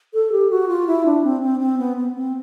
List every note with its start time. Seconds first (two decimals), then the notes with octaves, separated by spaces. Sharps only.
0.14 A4
0.32 G4
0.50 F#4
0.68 F4
0.87 E4
1.06 D4
1.24 C4
1.42 C4
1.60 C4
1.78 B3
1.97 B3
2.15 C4